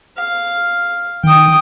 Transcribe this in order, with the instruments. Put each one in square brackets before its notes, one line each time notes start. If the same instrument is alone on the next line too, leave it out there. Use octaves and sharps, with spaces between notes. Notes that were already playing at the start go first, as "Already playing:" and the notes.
[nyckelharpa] F5
[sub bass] D#3 [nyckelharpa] G5 D#6